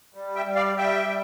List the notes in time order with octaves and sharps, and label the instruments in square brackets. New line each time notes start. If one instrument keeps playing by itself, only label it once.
[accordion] G3
E5 G5
G3
D5 F5
G3 E5 G5
G3